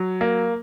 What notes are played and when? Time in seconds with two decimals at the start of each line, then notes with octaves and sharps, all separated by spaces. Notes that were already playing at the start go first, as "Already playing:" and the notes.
Already playing: F#3
0.21 A#3